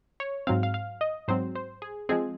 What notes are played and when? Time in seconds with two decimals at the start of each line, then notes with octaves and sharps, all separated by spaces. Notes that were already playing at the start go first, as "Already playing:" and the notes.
0.20 C#5
0.47 G#2 F#3 C4 F5
0.63 F5
0.74 F5
1.01 D#5
1.28 G#2 F#3 C4 C5
1.55 C5
1.82 G#4
2.09 F3 G#3 C4 G#4